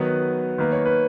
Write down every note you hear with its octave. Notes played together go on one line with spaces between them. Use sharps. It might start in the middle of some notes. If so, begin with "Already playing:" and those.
Already playing: D#3 F#3 B3 B4
D#3 A#3 B4
C#5
B4